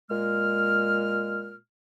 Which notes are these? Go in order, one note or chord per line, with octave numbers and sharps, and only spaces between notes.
A#2 G#3 F6